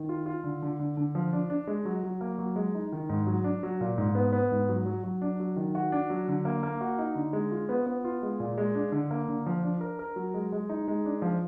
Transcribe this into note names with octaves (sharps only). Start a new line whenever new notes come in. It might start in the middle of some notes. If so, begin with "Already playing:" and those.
Already playing: D#3
F4
F4
D3
D3
D3
D3
F3
D4
D4
G#3
F#3
F#3
A#3
F#3
G#3
D#4
D#3
G#2
F#3
D4
F#3
A#2
G#2
B3
B3
G#2
F#3
F#3
F#3
D4
F#3
D#3
F#4
D4
F#3
D3
A#3
A#3
F#4
D#4
D3
G#3
F4
B3
B3
F4
G#3
A#2
G#3
D4
D3
A#3
D3
F3
D4
A#4
A#4
F#3
G#3
G#3
D#4
G#3
D4
F3